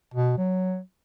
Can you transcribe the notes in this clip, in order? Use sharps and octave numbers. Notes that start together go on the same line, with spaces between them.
B2
F#3